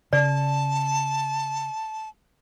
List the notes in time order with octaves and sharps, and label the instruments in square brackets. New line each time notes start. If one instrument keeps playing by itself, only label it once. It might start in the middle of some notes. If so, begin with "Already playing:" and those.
[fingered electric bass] C#3 [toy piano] D5 [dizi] A5